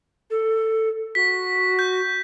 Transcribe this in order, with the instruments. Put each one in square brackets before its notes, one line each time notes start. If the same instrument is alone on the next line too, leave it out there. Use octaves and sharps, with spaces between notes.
[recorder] A4
[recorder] F#4 [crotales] B6
[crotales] G6